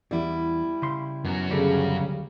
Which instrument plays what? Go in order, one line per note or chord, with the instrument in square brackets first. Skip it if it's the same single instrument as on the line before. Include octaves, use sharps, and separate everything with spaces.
[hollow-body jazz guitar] E2 [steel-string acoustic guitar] G3 E4
[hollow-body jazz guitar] C#3 C6
[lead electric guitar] F#2 F#3 [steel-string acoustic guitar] B3
[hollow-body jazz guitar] D2 G3 A4 [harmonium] C#3